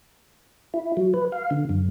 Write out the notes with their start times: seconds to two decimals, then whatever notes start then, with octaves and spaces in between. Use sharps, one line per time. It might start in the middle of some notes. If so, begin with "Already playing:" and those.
0.74 E4
0.97 F#3
1.14 B4
1.32 F5
1.51 D3
1.69 F#2